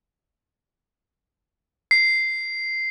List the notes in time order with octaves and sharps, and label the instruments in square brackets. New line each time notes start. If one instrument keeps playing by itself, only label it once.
[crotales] C7